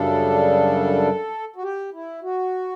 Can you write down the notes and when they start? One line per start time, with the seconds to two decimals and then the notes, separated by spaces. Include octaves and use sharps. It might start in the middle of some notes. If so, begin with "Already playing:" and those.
Already playing: F#2 C#3 G3 D4 A4
1.56 F#4
1.63 G4
1.93 E4
2.23 F#4